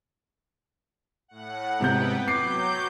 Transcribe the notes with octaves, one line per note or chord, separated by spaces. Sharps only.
A2 F#5
G#2 C3 B3 B4 G5 G6
F#3 D6 G6 C7